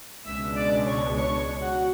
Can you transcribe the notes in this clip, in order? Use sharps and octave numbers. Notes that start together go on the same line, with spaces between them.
C#2 B2 G#3 D4 E5 E6
D5 D6
C#5 C#6
C#5 C#6
F#4 F#5